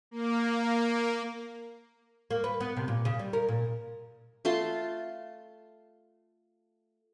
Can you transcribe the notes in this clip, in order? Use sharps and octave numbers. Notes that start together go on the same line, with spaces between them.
A#3
A#3
B4
B3
C3
A#2
C#3
G3
A#4
A#2
A3 F4 A5 C6